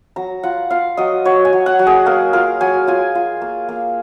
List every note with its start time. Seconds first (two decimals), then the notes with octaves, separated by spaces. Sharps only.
0.16 F#3 A#5
0.43 F4 F#5
0.70 F4 F5
0.97 F#3 D#5
1.25 F#3 C#5
1.45 G#5
1.53 F#3
1.66 F#5
1.79 F#3
1.87 G#4
2.06 A#3 A#4
2.33 F4 A#4
2.61 F#3 G#5
2.87 F4 G#5
3.15 F4
3.42 A#3
3.69 A#3